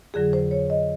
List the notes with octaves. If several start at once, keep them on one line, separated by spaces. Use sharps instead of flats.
F2 D3 F#3 G#4
C5
C#5
D#5